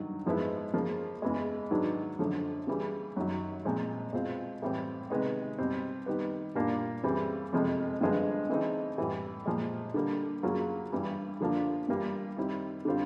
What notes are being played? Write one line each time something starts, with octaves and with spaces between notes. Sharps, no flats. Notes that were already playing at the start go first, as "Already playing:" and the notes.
Already playing: G2 D#3 F#3
G#2 F3 G#3 B3 E4
C#3 F3 A#3
E2 C#3 E3 G#3
G#2 D#3 F#3 B3 D4
F#2 D3 F3
C#3 E3 G3
F#2 D#3 F#3
A#2 F3 G#3 C4
B2 G#3 C4 F4
A2 E3 G3 C4
C3 D#3 G#3 B3 D#4
B2 G3 C4
D#3 G3 B3
A#2 G3 A#3 D4 F4
C#3 E3 G3 C4 E4
F2 C3 F3 G#3 C4
G2 D3 F3 G#3 B3
C#3 E3 A3 C4 D#4
A2 E3 G3
A#2 F3 G#3
D3 G3 A#3
C#3 F#3 A#3 C#4 F4
G2 E3 G3
D3 F3 A#3 D4 F4
G2 E3 G3 A#3
D#3 G3 C4 E4
D3 G3 C4 F4